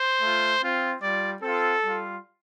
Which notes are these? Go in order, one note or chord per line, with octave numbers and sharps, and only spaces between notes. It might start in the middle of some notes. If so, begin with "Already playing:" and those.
Already playing: C5
A3 F4
C4 F4
G3 F4 D5
C4 F4 A4
G3 F4